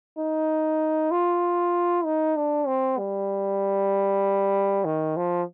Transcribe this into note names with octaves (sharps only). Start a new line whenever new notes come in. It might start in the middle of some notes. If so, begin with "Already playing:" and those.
D#4
F4
D#4
D4
C4
G3
D#3
F3